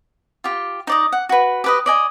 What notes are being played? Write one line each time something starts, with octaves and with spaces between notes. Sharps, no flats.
F4 G4
D#4 D5 D#5
F#5
F#4 B4
G4 B4 D#5
D5 D#5 G#5